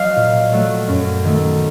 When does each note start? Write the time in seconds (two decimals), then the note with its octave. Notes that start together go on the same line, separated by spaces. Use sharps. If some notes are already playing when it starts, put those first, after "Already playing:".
Already playing: F#3 D#5 F5
0.16 A#2
0.52 F#3 A3
0.88 F#2
1.25 D#3 A3